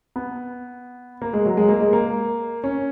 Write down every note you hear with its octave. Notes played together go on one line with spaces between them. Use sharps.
B3
A#3
G#3
F#3
G#3
A#3
G#3
A#3
C#4